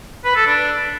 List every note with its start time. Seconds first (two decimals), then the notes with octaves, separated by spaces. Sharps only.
0.24 B4
0.35 A4
0.46 D4